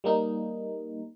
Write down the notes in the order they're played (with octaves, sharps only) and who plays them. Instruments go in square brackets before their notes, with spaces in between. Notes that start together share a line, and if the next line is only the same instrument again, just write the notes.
[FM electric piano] G3 A#3 D#4